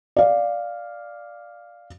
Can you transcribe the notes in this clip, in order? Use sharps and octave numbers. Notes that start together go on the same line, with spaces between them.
D5 F5